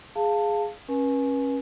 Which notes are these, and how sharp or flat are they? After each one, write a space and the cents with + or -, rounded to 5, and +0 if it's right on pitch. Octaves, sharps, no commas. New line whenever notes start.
G#4 +0 F5 +0 A5 +15
C#4 -25 B4 -35 G#5 +20